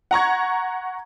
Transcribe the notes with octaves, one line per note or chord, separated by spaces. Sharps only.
F#5 A#5 C#6 G#6